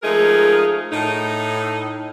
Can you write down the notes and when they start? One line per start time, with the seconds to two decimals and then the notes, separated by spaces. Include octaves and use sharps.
0.03 F3 G#3 A3 D#4 G#4 A#4
0.92 A2 D#4